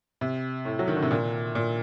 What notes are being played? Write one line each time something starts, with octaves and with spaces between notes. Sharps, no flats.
C3
A2
F#3
D#3
D3
C3
A#2
A#2